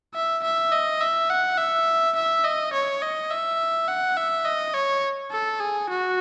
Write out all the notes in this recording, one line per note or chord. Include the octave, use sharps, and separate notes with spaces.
E5
E5
D#5
E5
F#5
E5
E5
D#5
C#5
D#5
E5
F#5
E5
D#5
C#5
A4
G#4
F#4